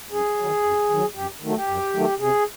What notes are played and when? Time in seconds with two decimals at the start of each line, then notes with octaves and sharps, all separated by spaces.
0.11 F#2 G#4
0.37 D#3 F#3
0.63 F#2
0.90 D#3 F#3
1.15 F#2 G4
1.41 D#3 F#3 A3
1.56 G4
1.68 F#2
1.94 D#3 F#3 A3
2.20 C3 G#4